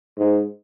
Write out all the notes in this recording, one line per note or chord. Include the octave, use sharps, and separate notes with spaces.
G#2